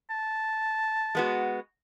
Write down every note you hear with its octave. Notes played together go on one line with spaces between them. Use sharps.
A5
G#3 B3 F#4